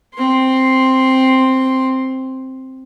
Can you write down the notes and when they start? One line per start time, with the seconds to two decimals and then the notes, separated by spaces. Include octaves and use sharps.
0.15 C4 C6